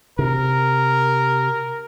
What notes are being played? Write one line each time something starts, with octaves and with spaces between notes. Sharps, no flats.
C3 A#4